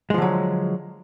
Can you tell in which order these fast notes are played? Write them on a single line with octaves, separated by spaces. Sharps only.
G#3 F3 D3 F#3